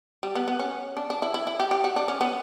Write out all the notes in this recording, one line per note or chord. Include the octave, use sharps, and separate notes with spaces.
G3
B3
B3
C#4
D4
D4
E4
E4
E4
G4
G4
F#4
D4
C#4
B3